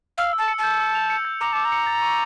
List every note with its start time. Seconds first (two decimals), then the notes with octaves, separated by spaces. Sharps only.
0.18 F5 E6
0.33 E6
0.38 A5
0.48 C#7
0.58 A5 G6
0.80 E6
0.95 F7
1.10 C#7
1.25 G6
1.41 A#5 D6
1.53 A5 D6
1.65 A#5
1.72 C#7
1.87 A6
2.02 C#6